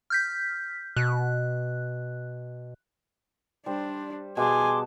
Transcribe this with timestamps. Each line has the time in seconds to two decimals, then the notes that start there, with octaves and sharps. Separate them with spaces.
0.10 F6 G6 B6
0.96 B2 F#6
3.66 G3 D4 C5
4.37 B2 G#4 G#5 A5 C6 D6